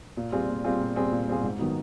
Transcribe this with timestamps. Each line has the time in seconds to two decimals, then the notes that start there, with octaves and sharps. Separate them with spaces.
0.17 A#2
0.32 G3 C4 F4 G#4
0.49 A#2
0.64 G3 C4 F4 G#4
0.80 A#2
0.96 G3 C4 F4 G#4
1.12 A#2
1.27 G3 C4 F4 G#4
1.43 G#2
1.59 D#3 F#3 B3 D#4